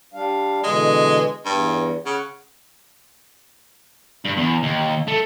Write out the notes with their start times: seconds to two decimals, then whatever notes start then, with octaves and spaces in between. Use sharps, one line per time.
0.14 G3 D4 F5
0.64 B2 D3 E3 G#3
1.46 E2 G2
2.06 C#3 F#5
4.25 G2
4.37 E2
4.63 D#2
5.08 A3